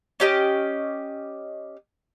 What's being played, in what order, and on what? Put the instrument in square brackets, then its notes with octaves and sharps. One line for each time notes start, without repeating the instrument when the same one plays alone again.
[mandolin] C#4 G4 D#5